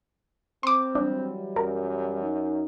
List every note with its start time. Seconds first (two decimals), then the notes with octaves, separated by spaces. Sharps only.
0.63 C4 C6 D6
0.95 E3 F#3 G3 D4
1.56 F#2 A#4
2.22 D#4